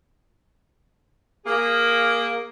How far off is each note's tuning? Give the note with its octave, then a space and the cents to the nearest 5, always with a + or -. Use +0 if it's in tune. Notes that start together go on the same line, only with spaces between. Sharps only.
A#3 +0 G#4 -20